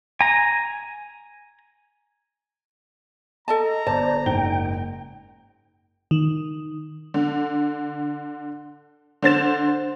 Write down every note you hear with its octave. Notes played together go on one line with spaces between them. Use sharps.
G#5 A#5
A4 D#5 A5 A#5
G1 C5 D5 A5
F#1 G#2 G5 G7
D#3
D3
D3 C5 A6 E7